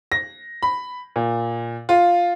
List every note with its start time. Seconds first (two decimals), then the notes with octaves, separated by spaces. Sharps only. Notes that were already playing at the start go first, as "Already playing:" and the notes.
0.12 A#6
0.63 B5
1.16 A#2
1.89 F4